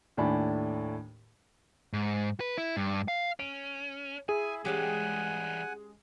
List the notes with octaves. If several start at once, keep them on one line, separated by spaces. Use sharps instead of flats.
D#2 A2 A3 D4 G#5 B5
G#2
B4
E4
G2
F5
C#4 D7
E4 G#4 E5 G#5
E3 G3 G#3 C#4 G4 F#5 G#5